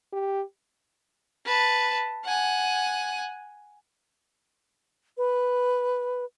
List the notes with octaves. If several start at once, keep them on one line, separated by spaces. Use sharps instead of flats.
G4
B4 A5
F#5 G#5
B4